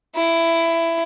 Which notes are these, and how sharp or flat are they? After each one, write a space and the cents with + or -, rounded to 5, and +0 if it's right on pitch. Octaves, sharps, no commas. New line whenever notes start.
E4 +15